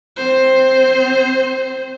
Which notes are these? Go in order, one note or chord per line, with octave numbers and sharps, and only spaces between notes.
C4 C5